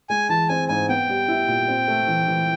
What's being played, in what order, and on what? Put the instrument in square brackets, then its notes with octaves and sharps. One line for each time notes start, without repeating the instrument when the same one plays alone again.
[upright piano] G#3 [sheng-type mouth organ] G#5
[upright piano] E3 [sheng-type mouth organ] A5
[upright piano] C4 [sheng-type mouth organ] G#5
[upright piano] G#2 [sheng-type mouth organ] G#5
[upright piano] B3 [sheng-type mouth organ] G5
[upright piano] G3
E4
A#2
C4
A3
E3
E3